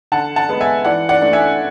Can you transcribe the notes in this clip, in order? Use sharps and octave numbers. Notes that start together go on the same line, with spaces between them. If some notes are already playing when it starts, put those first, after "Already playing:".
D3 F#5 A5
F#5 A5
G#3 B3
E5 G#5
E3 D5 F#5
D5 F#5
A3 D4
E5 G#5